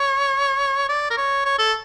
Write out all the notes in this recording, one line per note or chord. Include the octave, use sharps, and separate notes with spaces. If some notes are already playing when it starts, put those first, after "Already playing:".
Already playing: C#5
D5
A#4
C#5
C#5
A4